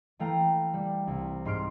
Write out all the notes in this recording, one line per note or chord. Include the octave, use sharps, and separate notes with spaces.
E3 A3 F5 G5 A#5
G3
C2
G#2 C6 F6 D7